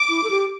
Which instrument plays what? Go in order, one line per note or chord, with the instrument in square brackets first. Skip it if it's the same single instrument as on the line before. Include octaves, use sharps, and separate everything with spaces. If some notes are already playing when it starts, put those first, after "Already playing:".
Already playing: [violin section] D6
[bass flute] E4
A4
G4